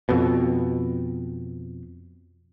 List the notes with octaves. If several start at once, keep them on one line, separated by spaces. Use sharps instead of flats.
F2 B2